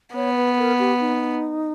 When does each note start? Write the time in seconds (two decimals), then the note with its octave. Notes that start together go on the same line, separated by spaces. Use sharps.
0.15 B3 C#5
0.36 B4
0.58 A#4
0.79 G4
1.00 D#4